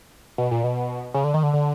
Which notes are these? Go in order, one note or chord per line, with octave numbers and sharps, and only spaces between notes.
B2
A#2
B2
C#3
D3
D#3
D3
D3